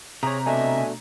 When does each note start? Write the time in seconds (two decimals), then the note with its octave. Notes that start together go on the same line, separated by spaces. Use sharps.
0.23 C3 G#4 C#5 A#5
0.46 B2 A3 D4 D#5 E5 G#5